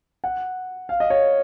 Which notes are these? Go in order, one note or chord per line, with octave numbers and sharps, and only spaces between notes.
F#5
F5
D#5
C#5